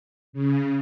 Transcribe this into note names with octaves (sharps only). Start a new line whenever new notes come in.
C#3